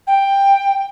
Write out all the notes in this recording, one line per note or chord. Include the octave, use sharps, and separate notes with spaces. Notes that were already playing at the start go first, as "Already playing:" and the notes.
G5